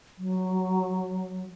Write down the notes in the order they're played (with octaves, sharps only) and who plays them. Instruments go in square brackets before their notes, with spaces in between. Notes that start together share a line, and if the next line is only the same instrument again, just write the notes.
[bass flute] F#3